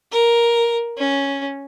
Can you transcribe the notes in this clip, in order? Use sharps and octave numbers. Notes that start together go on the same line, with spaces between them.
A#4
C#4